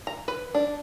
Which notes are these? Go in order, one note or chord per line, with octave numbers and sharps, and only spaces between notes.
A#5
B4
D4